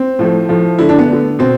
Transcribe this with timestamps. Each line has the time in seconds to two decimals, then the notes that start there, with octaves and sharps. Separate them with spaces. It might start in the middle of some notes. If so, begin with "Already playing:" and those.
Already playing: C4
0.19 A2 F3 A3
0.49 A2 F3 A3
0.78 D3 A3 E4
0.89 D4
0.99 B3
1.09 D3 A3
1.39 B2 C4